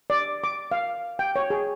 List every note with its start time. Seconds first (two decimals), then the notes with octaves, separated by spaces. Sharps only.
0.10 D5
0.44 D6
0.71 F5
1.19 G5
1.36 C#5
1.50 G#4